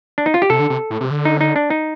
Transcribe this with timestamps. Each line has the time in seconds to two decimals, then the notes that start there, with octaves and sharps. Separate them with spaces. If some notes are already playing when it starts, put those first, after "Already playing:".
0.18 D4
0.26 D#4
0.34 F4
0.42 G4
0.50 C3 A4
0.59 D3
0.70 C3
0.90 A2
1.01 C3
1.11 D3
1.25 D#4
1.41 D#4
1.56 D4
1.70 D#4